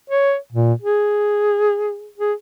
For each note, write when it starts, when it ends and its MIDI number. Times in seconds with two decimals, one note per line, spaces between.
0.10 0.36 73
0.52 0.73 46
0.81 2.10 68
2.18 2.33 68